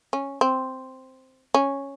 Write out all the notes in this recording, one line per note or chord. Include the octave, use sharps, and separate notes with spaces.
C#4
C4
C#4